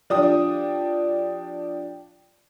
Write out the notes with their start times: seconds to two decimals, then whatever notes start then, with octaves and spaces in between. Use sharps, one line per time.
0.10 F3 D4 G4 D#6